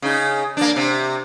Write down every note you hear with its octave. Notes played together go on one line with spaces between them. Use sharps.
C#3 D#4
A#3 D4
C3